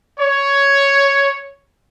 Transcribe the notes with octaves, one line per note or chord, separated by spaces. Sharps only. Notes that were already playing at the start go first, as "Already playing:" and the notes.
C#5